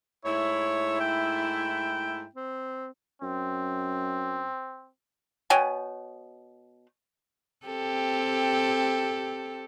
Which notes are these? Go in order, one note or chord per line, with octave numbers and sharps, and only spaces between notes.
G#2 A3 E4 C#5
G5
C4
F#2 C4
B2 C#5 G5 G#5
C4 G4 A4